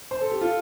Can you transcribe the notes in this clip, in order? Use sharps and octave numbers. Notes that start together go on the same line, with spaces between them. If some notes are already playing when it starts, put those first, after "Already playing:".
C5
A4
G4
F4 A4